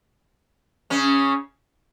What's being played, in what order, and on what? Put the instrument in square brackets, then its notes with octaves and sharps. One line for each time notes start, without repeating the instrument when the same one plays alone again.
[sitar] C#3 C#4